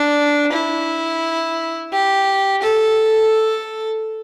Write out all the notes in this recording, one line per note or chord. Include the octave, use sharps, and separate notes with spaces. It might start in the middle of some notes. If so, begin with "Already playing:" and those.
Already playing: D4
E4
G4
A4